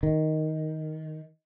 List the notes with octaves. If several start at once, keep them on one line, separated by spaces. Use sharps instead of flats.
D#3